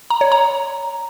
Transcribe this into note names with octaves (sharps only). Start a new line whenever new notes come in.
A#5
C#5
A#5